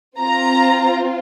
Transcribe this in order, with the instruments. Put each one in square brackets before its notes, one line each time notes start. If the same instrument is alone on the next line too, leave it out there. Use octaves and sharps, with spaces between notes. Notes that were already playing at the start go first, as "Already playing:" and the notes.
[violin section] C4 F4 A#5